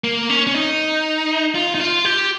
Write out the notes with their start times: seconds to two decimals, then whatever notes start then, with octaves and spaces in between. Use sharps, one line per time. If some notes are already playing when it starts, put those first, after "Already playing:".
0.04 A#3
0.30 C#4
0.47 C#4
0.54 D#4
1.55 F4
1.75 D#4
1.80 F4
2.05 G4